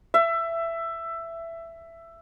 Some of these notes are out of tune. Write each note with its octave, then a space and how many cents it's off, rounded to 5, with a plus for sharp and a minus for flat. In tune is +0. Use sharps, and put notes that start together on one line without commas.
E5 +15